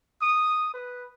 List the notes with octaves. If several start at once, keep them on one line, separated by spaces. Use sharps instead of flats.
D#6
B4